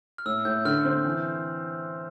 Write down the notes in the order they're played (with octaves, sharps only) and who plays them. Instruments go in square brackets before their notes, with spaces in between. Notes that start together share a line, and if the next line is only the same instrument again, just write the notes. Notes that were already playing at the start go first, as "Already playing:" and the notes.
[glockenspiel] F6
[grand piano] A2 [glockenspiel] E6
[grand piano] A2 [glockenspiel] G6
[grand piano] D3 [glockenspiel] F6
[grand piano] C4
E3